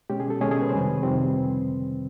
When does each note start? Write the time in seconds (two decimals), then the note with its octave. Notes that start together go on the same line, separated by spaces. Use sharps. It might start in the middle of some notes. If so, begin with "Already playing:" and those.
0.10 B2 G#3 C#4 G4
0.20 G#4
0.30 A4
0.40 B2 G#3 C#4 G#4
0.51 G#4
0.61 B4
0.69 C5
0.72 F2 C3 D#3 G3 C4 B4
1.03 F2 C3 D#3 G3 C4